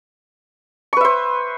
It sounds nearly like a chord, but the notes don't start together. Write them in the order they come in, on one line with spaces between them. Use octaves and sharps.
C#6 B4 E5 C5